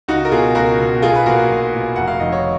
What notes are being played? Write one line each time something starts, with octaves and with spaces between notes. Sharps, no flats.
C#2 D#4 F#4
A#4
B2 F4 G#4
C#2 F#4 A#4
B2
B1 F4 G#4
B4
A#2 F#4 A#4
B1
A#2
F1 F#5
F5
F2 D#3 D#5
C#5